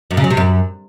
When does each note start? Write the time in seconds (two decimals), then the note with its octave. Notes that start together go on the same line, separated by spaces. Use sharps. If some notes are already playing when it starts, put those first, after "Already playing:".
0.11 F#2
0.17 C#3
0.24 F#3
0.30 C3
0.37 F#2